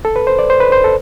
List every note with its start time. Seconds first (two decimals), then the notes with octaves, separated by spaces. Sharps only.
0.05 A4
0.16 B4
0.27 C5
0.39 D5
0.50 C5
0.60 B4
0.72 C5
0.84 A4